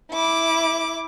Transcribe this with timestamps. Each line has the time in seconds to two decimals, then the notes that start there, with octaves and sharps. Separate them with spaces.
0.11 E4 D6